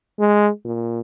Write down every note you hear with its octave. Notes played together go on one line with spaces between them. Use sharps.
G#3
A#2